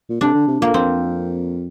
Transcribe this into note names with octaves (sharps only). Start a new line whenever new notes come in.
A#2
C3 D4
D3
C3
A#2 A#3
F2 C4